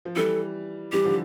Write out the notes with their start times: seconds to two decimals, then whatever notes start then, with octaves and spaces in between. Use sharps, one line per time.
0.05 F3
0.16 E3 G3 A4
0.92 E3 G3 G4
1.05 D3 F3